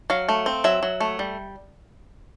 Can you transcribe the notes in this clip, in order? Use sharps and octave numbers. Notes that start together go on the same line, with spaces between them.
F#3 F5
A3
C4
F#3 E5
F#3
A3
G3